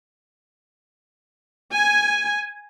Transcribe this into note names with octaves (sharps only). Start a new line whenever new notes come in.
G#5